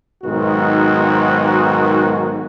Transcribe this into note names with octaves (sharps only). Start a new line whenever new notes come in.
B1 G#2 D#3 F#4